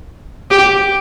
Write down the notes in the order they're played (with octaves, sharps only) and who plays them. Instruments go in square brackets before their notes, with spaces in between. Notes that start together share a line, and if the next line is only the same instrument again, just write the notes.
[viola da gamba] G4